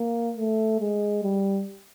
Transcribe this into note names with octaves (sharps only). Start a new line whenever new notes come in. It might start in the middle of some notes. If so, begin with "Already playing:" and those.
Already playing: A#3
A3
G#3
G3